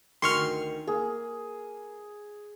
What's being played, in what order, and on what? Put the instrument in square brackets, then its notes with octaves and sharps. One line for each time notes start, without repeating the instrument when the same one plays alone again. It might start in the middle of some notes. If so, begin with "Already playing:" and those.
[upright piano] D2 D#3 [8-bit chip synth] C6 C#6 F6
[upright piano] A#3 [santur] G#4